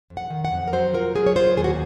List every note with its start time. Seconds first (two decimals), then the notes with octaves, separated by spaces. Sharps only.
0.10 F2
0.17 F#5
0.30 D#3
0.45 F#5
0.52 F2
0.67 A#4
0.73 F#3 C5
0.94 F4 A#4
1.15 F#3 G#4
1.27 C#5
1.36 F4 C5
1.57 D#2 G#4
1.64 F#4